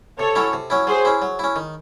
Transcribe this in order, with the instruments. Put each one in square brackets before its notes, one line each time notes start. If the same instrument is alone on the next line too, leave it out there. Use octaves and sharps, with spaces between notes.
[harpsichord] C3 [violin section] A4 C#5
[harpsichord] F#3 C#4 E4
C3
F#3 C#4 E4
[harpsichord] F#3 [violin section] G#4 C5
[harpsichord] C#4 E4
F#3
C#4 E4
D#3